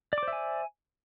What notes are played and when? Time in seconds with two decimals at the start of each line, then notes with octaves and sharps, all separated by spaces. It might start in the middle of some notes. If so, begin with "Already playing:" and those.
0.13 D5
0.18 D6
0.23 C5
0.28 E5
0.33 G#5